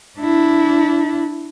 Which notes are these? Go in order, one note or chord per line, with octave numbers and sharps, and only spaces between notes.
D4 E4